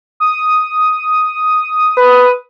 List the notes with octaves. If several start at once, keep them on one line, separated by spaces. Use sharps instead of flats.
D#6
B4